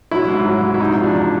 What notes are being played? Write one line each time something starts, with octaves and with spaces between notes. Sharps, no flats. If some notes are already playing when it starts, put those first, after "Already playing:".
F#3 E4
G#2
F#3
G#2
E4
C3 D#4
F3
D4
E2